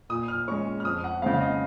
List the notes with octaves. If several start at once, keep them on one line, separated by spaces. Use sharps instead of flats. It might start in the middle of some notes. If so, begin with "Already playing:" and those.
A#2 D#6
F6
G#3 C#4 C#6
F6
F2 D#6
F#5
C#3 G#3 C4 F5
F5
D#5